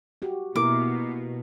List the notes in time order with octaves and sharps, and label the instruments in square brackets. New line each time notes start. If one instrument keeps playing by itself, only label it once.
[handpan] F#4 G4
[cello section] B2 [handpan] A#3 E4 A#4 [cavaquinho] D6